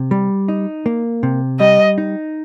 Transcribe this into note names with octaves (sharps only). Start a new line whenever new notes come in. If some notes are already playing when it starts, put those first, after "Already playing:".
Already playing: C3
G3
D#4
A#3
C3
G3 D#5
D#4